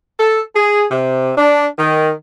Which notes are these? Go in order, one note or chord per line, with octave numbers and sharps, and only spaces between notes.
A4
G#4
C3
D4
D#3